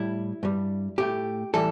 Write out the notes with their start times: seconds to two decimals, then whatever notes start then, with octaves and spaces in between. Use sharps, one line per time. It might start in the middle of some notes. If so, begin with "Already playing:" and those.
Already playing: A2 G3 E4
0.43 G2 G3
0.98 A2 A3 G4
1.54 A2 E3 G3 A4